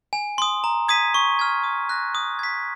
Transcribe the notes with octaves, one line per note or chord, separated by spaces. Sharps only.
G#5
C6 D#6
A#5
D#6 G#6 B6 D#7
C#6
F6 G#6
D#6
F#6 A#6
D#6
G#6 B6